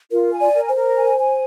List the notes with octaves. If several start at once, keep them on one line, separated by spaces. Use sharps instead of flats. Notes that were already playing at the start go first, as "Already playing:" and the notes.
F4 A#4
G#5
D5
A#4
C5
A#4
G#5
G#5